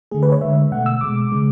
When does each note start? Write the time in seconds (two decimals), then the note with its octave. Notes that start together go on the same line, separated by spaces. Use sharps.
0.11 D3 A3 G#4
0.23 B4
0.32 C#5
0.41 D3 G#3 E5
0.72 B2 A3 F#5
0.86 E6
1.01 B2 G#3 D6
1.32 C#3 G#3